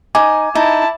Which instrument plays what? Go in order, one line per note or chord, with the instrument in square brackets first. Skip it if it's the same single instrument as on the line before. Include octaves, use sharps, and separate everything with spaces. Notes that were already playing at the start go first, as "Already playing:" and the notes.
[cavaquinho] D#4 [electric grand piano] G#5 [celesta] D6
[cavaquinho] D#4 [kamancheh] E4 A5